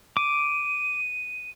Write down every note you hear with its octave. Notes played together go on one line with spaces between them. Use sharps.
D6 D#7